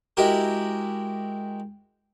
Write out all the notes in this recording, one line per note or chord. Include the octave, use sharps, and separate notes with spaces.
G#3 E4 F#4 G4 A#4